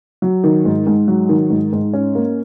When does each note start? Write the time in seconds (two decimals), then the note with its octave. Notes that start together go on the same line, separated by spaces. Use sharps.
0.22 F#3
0.44 D#3
0.65 G#2
0.87 G#2
1.08 F#3
1.29 D#3
1.50 G#2
1.73 G#2
1.93 C#4
2.15 A#3